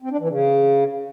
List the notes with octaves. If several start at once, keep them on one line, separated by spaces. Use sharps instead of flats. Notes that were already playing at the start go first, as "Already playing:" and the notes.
C4
D4
E3
C#3